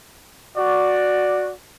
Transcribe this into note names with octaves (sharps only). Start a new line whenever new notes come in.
F#4 D5